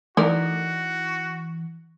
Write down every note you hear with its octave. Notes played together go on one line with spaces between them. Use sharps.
E3 A3 D#4 F#4 A#4 D5